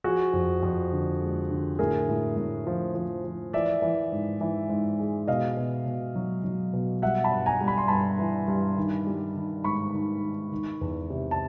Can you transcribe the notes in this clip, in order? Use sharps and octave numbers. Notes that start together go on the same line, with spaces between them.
F3 F#4 G#4
F2
F2
D3
G#3
D3
A2 G#4 A#4
A2
A2
F3
F3
F3
E3 D5 E5
E3
G#2
E3
G#2
G#3
B2 D#5 F5
B2
B2
F#3
F#3
B2
G3 E5 F#5
A5 B5
G2
G#5 A#5
G3
B5
C6
G2 A5 B5
E3
G2
D#3
G3
D#3
G#2 B5 C#6
D#3
D#3
D#3
E2
C3
A5